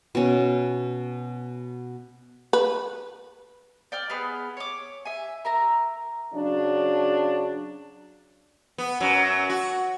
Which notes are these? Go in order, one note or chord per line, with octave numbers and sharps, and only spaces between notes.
B2 C#4
B4
D5 G5 F6
B3 G#4 B4 F6
C#5 D6
E5 G#5
A#4 E5 A#5
C#3 F#3 D4
B3
F#2 F#3
F#4